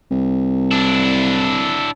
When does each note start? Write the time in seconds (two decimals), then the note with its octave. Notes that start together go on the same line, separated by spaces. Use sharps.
0.11 C2
0.71 D4 E4